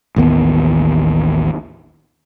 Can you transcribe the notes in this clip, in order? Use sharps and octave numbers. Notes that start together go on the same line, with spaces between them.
A1 D#2 D#3 B3